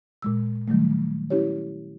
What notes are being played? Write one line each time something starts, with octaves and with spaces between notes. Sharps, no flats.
A#2 G#3 E6
D#3 F#3 G3 A3
C#4 E4 G4 C#5